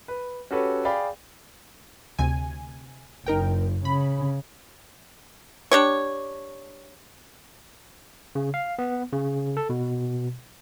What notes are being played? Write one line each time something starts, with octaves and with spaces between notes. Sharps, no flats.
B4
C#4 F#4 G4 A4 B4 C#5
G#4 D5 F5 G5 B5
D2 C3 G#5
F#1 D#4 A#4 G5
C#3 B5
D4 G4 C#5
C#3
F5
B3
C#3
A4
B2